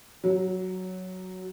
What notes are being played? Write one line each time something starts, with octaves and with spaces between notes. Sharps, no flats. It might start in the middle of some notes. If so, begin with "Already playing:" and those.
F#3